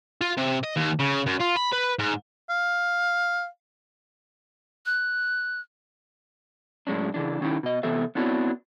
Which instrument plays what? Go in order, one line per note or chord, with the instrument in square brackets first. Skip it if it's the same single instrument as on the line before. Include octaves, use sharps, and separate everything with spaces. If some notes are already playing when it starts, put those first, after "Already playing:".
[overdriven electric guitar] F4
C3
D#5
D#2
C#3
F#2
F4
B5
B4
G#2
[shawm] F5
[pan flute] F#6
[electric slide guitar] A2 F#3 G#3 C#4 D4
C#3 E3 D4
D#3 C#4 D#4 E4 G4
B2 D#5
C3 E3 B3 A4 C5 E5
B3 C4 D4 E4 F#4 C#5